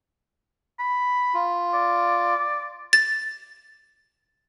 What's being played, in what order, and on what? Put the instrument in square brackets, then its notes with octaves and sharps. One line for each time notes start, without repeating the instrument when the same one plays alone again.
[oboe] B5
[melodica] F4
[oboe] D5
[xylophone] A6